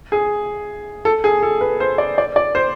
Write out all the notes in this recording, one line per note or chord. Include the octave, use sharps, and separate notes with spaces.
G#4
A4
G#4
A4
B4
C5
D5
D5
D5
C5